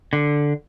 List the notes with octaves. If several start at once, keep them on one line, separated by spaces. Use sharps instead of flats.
D3